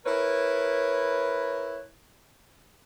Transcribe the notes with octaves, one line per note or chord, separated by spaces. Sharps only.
E4 A#4 B4 C#5